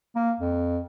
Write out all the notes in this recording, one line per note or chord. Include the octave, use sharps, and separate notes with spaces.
A#3
F2